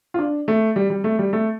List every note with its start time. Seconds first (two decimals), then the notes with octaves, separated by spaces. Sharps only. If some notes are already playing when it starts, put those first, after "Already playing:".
0.14 F4
0.19 D4
0.48 A3
0.76 G3
0.90 G3
1.04 A3
1.19 G3
1.33 A3